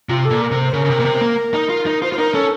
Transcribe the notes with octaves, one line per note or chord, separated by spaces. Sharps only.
C3 F4
A4
A#2
A#4
C3
C5
C#3 A#4
C#3
C3
A#2
C3
C4
A#3
D#4
F4
D#4
F4 C5
F4 C5
D#4 A#4
C#4 A4